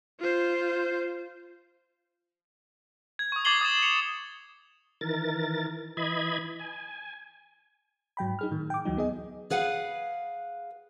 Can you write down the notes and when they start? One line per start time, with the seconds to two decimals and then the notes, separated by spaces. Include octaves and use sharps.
0.20 F4 C5
3.19 G#6
3.32 C#6 D#6
3.45 D6 G#6 A6 C7 F#7 G7
3.61 D#6 A6 E7
3.82 C#7 F7
5.01 D#3 E3 A#4 A6
5.97 E3 D#5 B5 G#6
6.59 G#5
8.17 G#2 F#3 G5 B5
8.39 D#4 G#4 F6
8.51 A2 D#3
8.70 G5 D6
8.85 D2 E3 F#3 D#4
8.97 B3 G#4 D#5
9.50 G#4 B4 F5 F#5